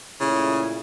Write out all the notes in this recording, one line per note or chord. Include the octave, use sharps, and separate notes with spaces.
A#2 C#3 A3 E4